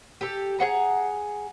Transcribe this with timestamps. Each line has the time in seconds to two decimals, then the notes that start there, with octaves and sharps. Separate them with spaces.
0.21 G4 A4
0.59 G#4 C5 F#5 A#5